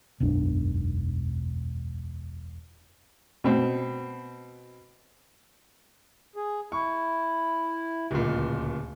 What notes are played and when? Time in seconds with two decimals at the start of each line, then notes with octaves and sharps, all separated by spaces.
0.20 E1 B1 F#2 D4
3.44 B2 C4
6.36 G#4
6.72 E4 C#6
8.11 D1 C#2 A#2